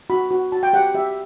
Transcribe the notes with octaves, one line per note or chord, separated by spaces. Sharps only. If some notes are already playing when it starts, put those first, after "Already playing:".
F#4 B5
F#4
F#4 A5
G5
G4 F#5
G4 E5